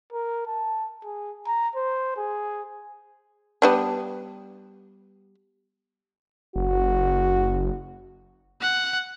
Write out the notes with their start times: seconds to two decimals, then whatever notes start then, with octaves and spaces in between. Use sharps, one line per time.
0.13 A#4
0.47 A5
1.05 G#4
1.47 A#5
1.76 C5
2.17 G#4
3.62 G3 B3 D4
6.56 F#1 F#4
8.61 F#5